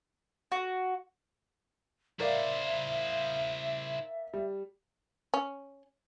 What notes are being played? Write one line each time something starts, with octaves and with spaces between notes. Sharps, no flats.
F#4
E4 A#4 C5 D5 E5 F5
G3
C#4